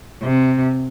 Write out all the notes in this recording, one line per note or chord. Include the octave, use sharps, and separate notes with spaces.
C3